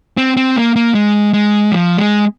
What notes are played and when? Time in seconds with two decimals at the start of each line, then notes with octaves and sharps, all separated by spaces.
0.17 C4
0.37 C4
0.56 A#3
0.76 A#3
0.95 G#3
1.33 G#3
1.72 F3
1.97 G#3